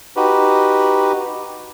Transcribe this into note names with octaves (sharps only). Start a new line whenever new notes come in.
D#4 F#4 G4 B4